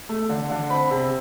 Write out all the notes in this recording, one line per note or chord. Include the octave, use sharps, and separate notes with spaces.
A3
D3
D3
C4 B5
C3